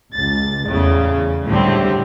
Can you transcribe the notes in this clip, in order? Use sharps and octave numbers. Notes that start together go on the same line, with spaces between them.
C#2 A6
E2 A2 C#3
C#2 A2 D3 G3 C4